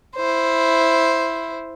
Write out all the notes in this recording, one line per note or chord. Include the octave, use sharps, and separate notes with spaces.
E4 C5